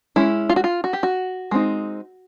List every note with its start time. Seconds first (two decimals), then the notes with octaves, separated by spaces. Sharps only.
0.16 G#3 C#4 E4
0.49 F4
0.56 F#4
0.64 F4
0.84 F#4
0.93 G4
1.03 F#4
1.51 G#3 C4 D#4